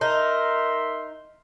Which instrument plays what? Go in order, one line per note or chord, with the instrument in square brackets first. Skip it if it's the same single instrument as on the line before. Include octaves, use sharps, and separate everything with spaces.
[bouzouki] D#4 [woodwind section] A#4 E5 C6